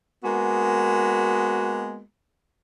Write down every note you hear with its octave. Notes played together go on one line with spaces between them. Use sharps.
G#3 A#3 B3 F#4